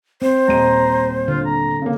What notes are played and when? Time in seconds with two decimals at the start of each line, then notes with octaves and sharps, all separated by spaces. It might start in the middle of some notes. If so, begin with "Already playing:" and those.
0.22 C4 C5
0.48 D#1 D#5 A#5 D#7
1.28 D3 F4
1.46 A#5
1.82 C#3 A#3